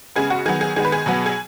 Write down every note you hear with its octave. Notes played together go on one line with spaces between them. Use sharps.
C#3 G#3 B3 G#4
F#4
D#3 F#3 B3 G#4
G#4
D#3 G#3 B3 G#4
B4
G#4
B2 F#3 B3
G#4